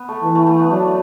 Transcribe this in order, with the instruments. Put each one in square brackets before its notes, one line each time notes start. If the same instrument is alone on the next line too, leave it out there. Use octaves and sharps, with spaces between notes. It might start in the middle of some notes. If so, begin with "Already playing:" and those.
Already playing: [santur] B3
A3
[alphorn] E3
[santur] A3
A3
B3
[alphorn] F#3 [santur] D4